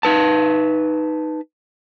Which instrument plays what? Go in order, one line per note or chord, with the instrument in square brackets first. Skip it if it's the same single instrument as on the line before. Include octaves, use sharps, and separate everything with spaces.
[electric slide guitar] D#4 B4 A5